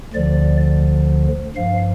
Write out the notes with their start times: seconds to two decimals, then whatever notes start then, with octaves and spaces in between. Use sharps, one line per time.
0.13 D2 D3 F3 D5
1.56 G2 F3 F5